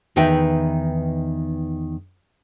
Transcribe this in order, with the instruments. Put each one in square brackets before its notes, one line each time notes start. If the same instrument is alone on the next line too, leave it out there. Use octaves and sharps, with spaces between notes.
[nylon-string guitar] E2 D#3 D#4 B4 E5 G5